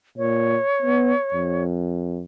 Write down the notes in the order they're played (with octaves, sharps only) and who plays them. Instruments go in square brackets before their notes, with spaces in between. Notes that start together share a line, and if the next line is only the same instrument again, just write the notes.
[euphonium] A#2 [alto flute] C#5
[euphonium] B3
F2